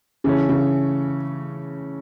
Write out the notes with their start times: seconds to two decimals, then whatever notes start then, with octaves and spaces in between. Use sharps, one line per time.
0.24 C#3 E3 A3 C#4
0.49 C#3